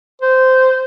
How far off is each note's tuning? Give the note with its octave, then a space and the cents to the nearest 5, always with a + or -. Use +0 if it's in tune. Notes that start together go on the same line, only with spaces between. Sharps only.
C5 -10